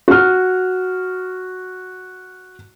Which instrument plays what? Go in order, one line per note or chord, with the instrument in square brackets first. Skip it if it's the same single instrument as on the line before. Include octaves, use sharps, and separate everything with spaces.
[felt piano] F#4 F6